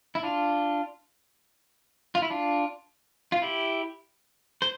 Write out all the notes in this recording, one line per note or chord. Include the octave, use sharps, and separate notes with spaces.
E4
D4 F4
F4
E4
D4 F4
F4
E4 G4
C5